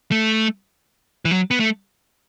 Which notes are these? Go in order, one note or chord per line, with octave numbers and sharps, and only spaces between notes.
A3
E3
F#3
B3
A3